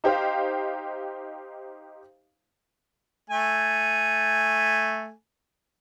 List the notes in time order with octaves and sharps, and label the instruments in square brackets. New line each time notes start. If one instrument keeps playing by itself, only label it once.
[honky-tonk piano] D#4 G4 C5 F5
[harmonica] A3 G#5